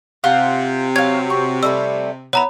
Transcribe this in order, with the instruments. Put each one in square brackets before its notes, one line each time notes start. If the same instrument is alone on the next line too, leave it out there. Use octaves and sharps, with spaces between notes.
[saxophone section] C3 [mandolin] F4 F#5
[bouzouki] F#3 [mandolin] C#5 F5 [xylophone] G#6
[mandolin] C#6
[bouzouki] G3 A3 E4 [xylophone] E6
[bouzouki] B3 E4 [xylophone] C#5 A#5 B5